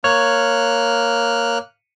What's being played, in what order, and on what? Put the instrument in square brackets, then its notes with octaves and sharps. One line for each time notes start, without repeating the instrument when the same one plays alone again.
[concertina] A#3 F6 F#6 [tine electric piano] C#5